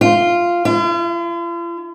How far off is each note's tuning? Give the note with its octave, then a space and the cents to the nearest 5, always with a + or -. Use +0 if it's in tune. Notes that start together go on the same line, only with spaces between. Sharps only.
F4 -5
F4 -45